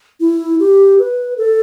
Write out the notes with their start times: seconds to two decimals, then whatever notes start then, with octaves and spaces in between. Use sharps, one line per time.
0.21 E4
0.60 G4
0.99 B4
1.38 A4